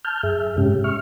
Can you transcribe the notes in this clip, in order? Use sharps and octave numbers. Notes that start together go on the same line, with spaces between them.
A5 F6 G6
F#2 G#4 E5
G#2 C3 G#3 C#4 G4
E5 C#6 F6